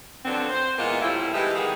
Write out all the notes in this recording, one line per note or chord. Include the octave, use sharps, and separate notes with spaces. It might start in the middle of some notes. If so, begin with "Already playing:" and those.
D3 F3 F#3 B3 C4 D4
C5
A#2 E3 G#3 A#3 B3 F4
A2 F3 G3 C4 E4
E3 F3 G#3 D#4 E4 G4
D#3 G3 A#3 B3 G#4